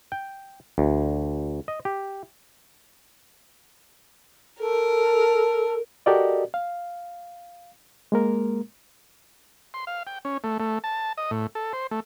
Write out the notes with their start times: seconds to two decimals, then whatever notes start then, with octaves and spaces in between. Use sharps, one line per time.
0.12 G5
0.78 D2
1.68 D#5
1.85 G4
4.60 A4 A#4
6.06 F#4 G4 A4 A#4 D5 D#5
6.54 F5
8.12 G#3 A#3 A#4
9.74 C6
9.87 F5
10.07 G5
10.25 C#4
10.44 A3
10.60 A3
10.84 A5
11.17 D#5
11.31 A2
11.55 A4
11.73 C5
11.91 A3